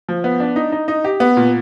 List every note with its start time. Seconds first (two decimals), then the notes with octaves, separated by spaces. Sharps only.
0.09 F3
0.24 B3
0.40 D4
0.56 D#4
0.72 D#4
0.88 D#4
1.05 G4
1.20 B3
1.37 A#2